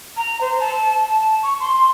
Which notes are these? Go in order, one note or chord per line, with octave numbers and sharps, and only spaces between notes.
A#5
C5
A5
A5
C#6
C6